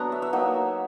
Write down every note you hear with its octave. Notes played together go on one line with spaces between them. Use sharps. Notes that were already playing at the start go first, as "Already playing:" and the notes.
Already playing: F#3 B3 D4 A#5
E5
E5
F#3 A#3 D#4